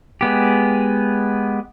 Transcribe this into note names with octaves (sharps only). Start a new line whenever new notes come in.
G#3 B3 G4